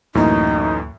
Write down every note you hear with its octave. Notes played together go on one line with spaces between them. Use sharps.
D1 F#2 A2 E3 A#3 D#4